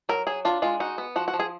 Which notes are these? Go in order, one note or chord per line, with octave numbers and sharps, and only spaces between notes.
F#3 A#4
F#3 G#4
D4 F4
G#3 F4
D#4 F#4
B3
F3 F#4
F#4
F3
G#4